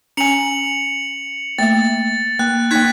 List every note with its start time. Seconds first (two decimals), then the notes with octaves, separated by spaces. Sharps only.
0.17 C#4 G#5 C#7 F7 F#7
1.59 A3 A#3 E5 A6
2.39 A#3 F#6
2.71 A#3 D#4 F#6 G#6 B6